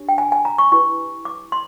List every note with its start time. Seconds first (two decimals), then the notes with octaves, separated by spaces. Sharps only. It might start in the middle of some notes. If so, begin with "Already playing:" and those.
Already playing: D4 G4 C#5
0.09 G5
0.18 G#5
0.32 G#5
0.45 A#5
0.58 C#6
0.72 E4 G4 B4 C#6
1.25 D6
1.52 C6